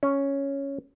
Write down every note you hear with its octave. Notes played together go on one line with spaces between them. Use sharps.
C#4